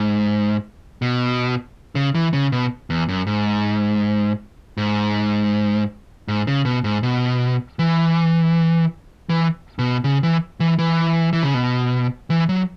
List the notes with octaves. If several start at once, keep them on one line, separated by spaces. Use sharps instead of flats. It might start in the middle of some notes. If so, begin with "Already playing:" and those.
Already playing: G#2
B2
C#3
E3
C#3
B2
E2
F#2
G#2
G#2
G#2
C#3
B2
G#2
B2
E3
E3
B2
C#3
E3
E3
E3
E3
C#3
B2
E3
F#3